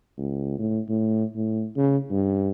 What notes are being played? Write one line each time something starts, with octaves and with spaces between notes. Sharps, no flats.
C#2
A2
A2
A2
C#3
G2